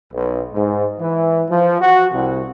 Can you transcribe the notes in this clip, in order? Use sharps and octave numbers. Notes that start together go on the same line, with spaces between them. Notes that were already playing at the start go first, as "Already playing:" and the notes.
B1
G#2
E3
F3
F#4
C2